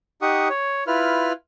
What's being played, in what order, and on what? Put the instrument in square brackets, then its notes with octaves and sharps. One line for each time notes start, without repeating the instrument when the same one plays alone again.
[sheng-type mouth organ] D#4 G4 F#5 C#6 D#6
C#5
E4 F4 B4 F6